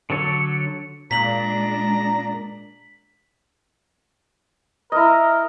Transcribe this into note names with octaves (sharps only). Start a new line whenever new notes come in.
D3 F#3 A4 C#5
A#2 G#3 D4 A#5 B6 F#7
E4 A#4 D#5